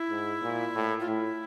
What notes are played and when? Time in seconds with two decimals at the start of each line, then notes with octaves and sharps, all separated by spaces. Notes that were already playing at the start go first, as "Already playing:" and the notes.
Already playing: E4
0.10 G#2
0.42 A#2
0.75 A2
1.00 F4
1.08 A2 E4